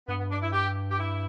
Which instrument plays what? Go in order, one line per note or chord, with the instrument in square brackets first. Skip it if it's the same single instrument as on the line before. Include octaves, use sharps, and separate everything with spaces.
[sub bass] G2 [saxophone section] B3
[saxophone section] B3
D4
E4
G4
G4
E4